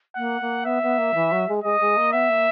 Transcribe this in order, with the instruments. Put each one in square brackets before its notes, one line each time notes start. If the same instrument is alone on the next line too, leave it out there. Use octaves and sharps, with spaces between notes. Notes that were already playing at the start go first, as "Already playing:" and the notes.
[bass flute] A#3 [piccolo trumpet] F#5
[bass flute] A#3
[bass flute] B3 [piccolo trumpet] E5
[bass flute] B3
A#3
E3
F#3
G#3
[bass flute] G#3 [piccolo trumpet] D#5
[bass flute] G#3
A#3
[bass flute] B3 [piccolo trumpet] E5
[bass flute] A#3